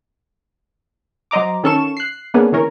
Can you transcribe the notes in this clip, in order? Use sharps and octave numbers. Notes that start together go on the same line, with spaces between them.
F#3 C5 D#5 A#5 D6
D#3 C#4 A4 F5 C#6 E7
F#6 C7
A#3 B3 C#4 D4 G#4
D3 E3 C#4 A#4